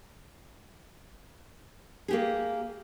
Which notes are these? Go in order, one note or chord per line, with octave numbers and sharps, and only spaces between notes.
A#3 G4 G#4